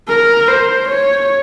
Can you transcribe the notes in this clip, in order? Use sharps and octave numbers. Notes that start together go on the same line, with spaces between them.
A#4
C5
C#5